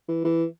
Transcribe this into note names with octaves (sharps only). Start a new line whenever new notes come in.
E3
E3